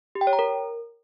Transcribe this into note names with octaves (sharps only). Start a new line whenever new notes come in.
G4
G5
C#5
A#5
A#4